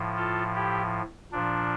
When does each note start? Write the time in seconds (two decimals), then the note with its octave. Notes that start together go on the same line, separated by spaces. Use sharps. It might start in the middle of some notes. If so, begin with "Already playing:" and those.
Already playing: A2 F3
0.16 F4 A4
0.55 E4 G4
1.32 A#2 F3 D4